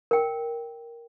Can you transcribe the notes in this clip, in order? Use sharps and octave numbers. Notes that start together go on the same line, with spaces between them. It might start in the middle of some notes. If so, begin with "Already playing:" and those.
A#4 G5